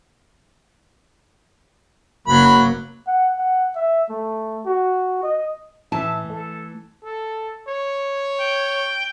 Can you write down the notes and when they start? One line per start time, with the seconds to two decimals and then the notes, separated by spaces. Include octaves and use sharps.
2.27 F#1 F#3 A#3 B5
3.07 F#5
3.39 F#5
3.76 E5
4.10 A3
4.66 F#4
5.23 D#5
5.92 A2 E3 E5 A5
6.30 A3 A4
7.05 A4
7.68 C#5
8.40 G5